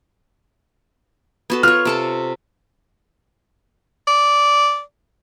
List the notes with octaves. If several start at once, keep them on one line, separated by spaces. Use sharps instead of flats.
B3 F#4 A4
F4 C#5 F6
C3 A4 C#6
D5